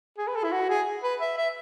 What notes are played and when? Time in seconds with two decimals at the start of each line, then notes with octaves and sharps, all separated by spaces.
0.18 G#4
0.28 B4
0.36 A4
0.44 E4
0.53 F#4
0.69 G#4
1.03 B4
1.21 E5
1.38 E5